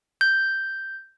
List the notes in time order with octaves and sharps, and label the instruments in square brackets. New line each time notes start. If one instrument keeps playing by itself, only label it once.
[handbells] G6